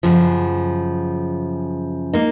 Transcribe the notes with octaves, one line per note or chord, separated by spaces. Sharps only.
F#2 C#3 F3
A#3 D#4